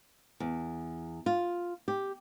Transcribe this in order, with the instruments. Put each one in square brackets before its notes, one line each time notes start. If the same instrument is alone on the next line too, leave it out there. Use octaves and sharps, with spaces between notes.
[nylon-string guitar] E2
F4
G4